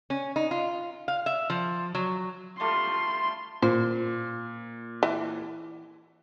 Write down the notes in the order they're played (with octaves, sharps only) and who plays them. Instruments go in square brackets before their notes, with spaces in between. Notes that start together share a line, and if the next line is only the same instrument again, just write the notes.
[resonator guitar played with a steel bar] C#4
D#4
F4
F5
E5
F3
F#3
[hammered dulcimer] G3 A3 F4 [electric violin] C6
[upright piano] A#2 [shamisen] C5
[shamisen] E3